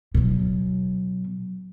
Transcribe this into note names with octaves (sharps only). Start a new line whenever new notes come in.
B2 F#3